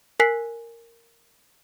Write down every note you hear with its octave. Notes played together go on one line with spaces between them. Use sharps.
A#4 G#5 F#6 B6 C7